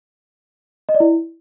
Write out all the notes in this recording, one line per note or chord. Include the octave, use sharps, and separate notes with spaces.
D#5
D5
E4